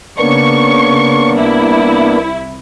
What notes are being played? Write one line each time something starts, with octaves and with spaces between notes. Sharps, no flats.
C#3 A#3 B3 D4 C#6
C2 E4